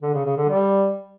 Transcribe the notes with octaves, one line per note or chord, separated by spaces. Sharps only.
D3
C#3
C#3
D3
G3